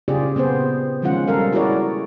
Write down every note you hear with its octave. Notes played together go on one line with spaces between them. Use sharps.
C#3 F4 G4 G#4 D5
A#2 B3 C4 G#4 C5
D#3 F3 G#3 C#4 F4 F#5
G3 A4 A#4 F5
E4 F#4 G#4 A#4 C#5 D5